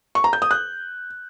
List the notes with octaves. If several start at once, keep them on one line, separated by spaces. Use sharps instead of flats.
C#6
A#5
G6
D#6
F#6